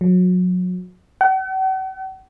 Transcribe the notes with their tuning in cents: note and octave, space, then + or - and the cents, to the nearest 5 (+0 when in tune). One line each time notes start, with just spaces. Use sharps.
F#3 -30
F#5 +45